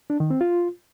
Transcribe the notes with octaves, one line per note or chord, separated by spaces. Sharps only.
D4
D#3
C4
F4